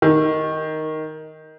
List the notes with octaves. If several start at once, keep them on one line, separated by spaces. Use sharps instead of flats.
D#3